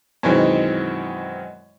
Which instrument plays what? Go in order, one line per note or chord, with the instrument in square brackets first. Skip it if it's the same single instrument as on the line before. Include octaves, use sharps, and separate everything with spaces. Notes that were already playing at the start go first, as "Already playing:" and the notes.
[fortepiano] F#2 B2 D#3 E3 G#3 C4